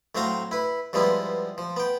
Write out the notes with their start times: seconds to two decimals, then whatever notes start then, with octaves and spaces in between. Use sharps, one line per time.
0.15 A2 F#3 C4 F5 A#5 C6
0.51 E4 B4
0.93 G2 F3 G#3 B3 E4 F4
1.58 F3
1.76 B3 G5